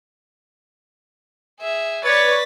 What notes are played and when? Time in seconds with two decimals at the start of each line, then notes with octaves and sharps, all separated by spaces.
1.61 G#4 E5
2.05 B4 C#5 D5 C#6 A6 B6